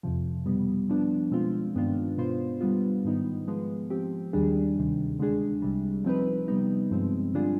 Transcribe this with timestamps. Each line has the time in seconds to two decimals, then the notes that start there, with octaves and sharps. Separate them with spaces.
0.03 F2 C3 F3
0.46 B2 G3 B3
0.89 F3 B3 D4
1.32 B2 G#3 C4 F4
1.75 G2 D#3 B3 D4 F4
2.18 B2 B3 F4 C5
2.61 D3 G3 B3 F4
3.04 G#2 D#3 B3 D#4
3.47 F3 G#3 B3
3.90 F3 C4 G4
4.33 D#2 D#3 G3 D4 G#4
4.76 D2 C3 D#3
5.19 D3 G#3 D4 G#4
5.62 C2 C3 G3
6.05 F3 C4 D#4 B4
6.48 C3 G3 B3 D#4
6.91 G2 F3 G#3 C4
7.34 D3 G3 D4 F4 G#4